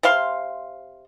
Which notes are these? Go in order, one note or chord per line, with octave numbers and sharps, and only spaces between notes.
C3 C5 F5 C6